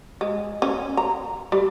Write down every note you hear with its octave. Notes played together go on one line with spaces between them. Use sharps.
G#3
C#4
A#5
G3